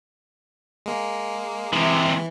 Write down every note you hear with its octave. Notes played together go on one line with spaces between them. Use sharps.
G#3 A#3
C3 E3 G#3